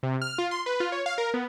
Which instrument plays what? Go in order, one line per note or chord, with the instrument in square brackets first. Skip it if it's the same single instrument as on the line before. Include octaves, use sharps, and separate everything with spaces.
[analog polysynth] C3
F6
F4
C6
B4
F4
C#5
F5
A#4
B3